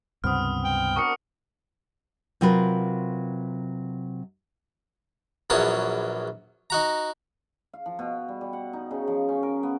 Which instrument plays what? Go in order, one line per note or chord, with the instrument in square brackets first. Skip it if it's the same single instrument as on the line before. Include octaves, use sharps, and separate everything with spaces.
[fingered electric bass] C#2 G2 C3 [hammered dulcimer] B3 C4 [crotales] D#6 F6
[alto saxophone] G5
[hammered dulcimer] D4 F#4 A#4 [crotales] C#6 D#6 C#7
[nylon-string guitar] C3 F#3 F4 A#4 B4
[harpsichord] A#1 E2 F#3 C#4 A5 D#6
D#4 F#4 A#5
[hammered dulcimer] F5
F3
B2
G3
G3
F#5
D#4
C#3
F3
C#4
A#4
B3